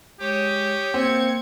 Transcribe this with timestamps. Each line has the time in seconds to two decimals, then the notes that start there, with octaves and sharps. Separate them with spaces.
0.20 G#3 G4 C#5 D#6
0.94 A#3 C4 G#6 C#7